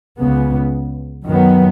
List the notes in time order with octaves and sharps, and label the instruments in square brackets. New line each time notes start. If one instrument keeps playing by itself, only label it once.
[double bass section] C#2 C#3 B3
F#2 D#3 F#3 B3